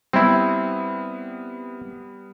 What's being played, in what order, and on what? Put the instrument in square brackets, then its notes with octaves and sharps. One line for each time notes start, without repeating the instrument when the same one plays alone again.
[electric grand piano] G3 B3 [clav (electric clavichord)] C4 E4